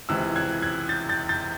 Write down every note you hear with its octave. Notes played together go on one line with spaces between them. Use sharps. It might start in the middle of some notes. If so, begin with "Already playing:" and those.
C#2 C3 E3 E6 F#6
F#6 G#6
F#6 G#6
G6 A6
G6 A6
G6 A6